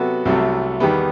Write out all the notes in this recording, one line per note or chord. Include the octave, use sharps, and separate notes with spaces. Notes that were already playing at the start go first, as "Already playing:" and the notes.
Already playing: C3 F#3 B3 F#4 A4
C2 C3 F#3 A3
E2 D#3 G3 B3